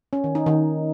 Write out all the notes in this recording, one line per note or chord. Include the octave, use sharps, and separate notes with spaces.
C#4
D#3
D#4
D#3